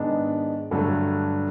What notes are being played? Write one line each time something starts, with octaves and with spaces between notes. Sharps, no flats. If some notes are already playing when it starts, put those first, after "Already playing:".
Already playing: G#2 D#3 G#3 B3 D4
G2 D3 F#3 A3